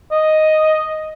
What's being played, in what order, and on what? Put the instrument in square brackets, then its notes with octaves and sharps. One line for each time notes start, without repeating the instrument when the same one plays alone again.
[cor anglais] D#5